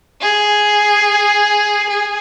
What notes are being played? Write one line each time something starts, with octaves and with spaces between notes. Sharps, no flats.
G#4
G#4